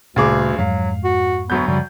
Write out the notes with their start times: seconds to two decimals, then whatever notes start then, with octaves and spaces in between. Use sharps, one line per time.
0.16 D2 G2 A#2 C#3 D4 G#4 D6
0.58 F2 G#2 F#3 G#3 F5
1.04 F#4
1.50 D2 F#3 B3 G6
1.67 F#2 C#3 F3 G3